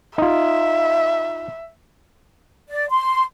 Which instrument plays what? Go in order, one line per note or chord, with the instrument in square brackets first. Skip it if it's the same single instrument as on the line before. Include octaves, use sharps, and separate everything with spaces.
[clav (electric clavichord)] D#4 F4 [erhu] E5
[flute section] D5
C6